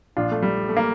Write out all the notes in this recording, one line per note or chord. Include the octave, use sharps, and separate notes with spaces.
A#1 A#2 D4 F4
A3
G3
A3
A#3